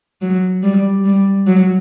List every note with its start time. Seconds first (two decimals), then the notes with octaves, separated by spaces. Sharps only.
0.22 F#3
0.63 G3
1.05 G3
1.47 F#3